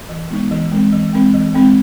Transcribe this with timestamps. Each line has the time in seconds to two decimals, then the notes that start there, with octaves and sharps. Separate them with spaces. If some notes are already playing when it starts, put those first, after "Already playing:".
0.09 E3
0.30 G#3 B3 D#4
0.51 E3
0.72 G#3 C4
0.93 E3
1.13 G#3 C4
1.34 E3
1.55 G#3 C4